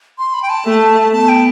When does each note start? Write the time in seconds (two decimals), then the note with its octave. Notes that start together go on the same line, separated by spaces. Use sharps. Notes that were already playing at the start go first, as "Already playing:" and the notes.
0.18 C6
0.34 B5
0.43 G5
0.50 A5
0.66 A3
1.13 B3 A5
1.29 G5